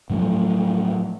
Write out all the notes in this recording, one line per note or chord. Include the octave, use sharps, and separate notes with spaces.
A2 F3 F#3 A3